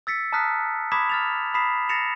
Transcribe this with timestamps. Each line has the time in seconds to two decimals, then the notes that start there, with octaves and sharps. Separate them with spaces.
0.07 E6 A6 B6 C#7
0.32 A5 A#5 D#6 F6 F#6 B6
0.92 B5 D6 D#6 G#6 B6 E7
1.09 F6 A6 F7
1.54 B5 D#6 B6 C7 E7
1.89 A6 A#6 C7 C#7 E7 F7